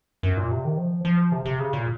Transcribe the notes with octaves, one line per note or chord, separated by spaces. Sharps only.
F#2
A#2
C3
D#3
F3
F3
C3
C3
C#3
A#2